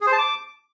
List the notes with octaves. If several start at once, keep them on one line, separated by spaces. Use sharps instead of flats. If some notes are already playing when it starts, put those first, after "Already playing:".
G#4
C5
A5
D6